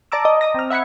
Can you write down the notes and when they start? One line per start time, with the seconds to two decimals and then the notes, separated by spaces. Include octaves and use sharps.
0.12 D5 A5 A#5 D6 E6
0.25 D#5
0.41 A#5 D#6 A#6
0.54 C4 F6
0.70 E5 F#5 B5 G#6 C#7